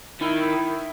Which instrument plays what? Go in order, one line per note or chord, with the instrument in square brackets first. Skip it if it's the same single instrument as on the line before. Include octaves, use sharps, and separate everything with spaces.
[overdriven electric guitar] D#3 [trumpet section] E4